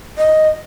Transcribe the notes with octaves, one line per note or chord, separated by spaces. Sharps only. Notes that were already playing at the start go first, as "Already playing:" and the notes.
D#5